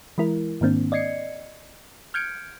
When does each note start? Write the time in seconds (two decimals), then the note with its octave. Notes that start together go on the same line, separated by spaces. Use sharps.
0.18 E3 G#3 E4 A#4
0.61 G#2 D#3 A#3 C4 D4
0.92 D5 D#5 G#6 C7 C#7
2.14 F6 G6 G#6 C#7 D7